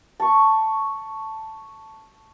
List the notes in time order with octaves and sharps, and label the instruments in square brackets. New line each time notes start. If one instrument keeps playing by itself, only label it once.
[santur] A5 C#6